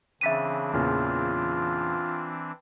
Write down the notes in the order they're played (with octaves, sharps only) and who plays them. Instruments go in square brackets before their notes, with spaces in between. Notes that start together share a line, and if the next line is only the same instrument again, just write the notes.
[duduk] C#3 [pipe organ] E3 C4 D4 [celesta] E5 B6 D#7
[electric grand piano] E2 A#2 C#3 [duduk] F4